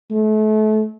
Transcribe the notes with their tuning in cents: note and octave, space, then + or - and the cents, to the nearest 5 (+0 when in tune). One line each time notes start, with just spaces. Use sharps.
A3 -35